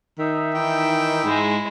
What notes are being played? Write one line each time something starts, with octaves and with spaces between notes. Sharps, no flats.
D#3 D#4 E5
E3 G5
G#2 G#3 E4